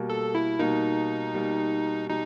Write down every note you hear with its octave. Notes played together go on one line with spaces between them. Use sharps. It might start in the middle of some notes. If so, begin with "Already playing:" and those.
Already playing: B2 G3 A#3
A4
E4
B2 G3 A#3 D#4
B2 G3 A#3
B2 G3 D#4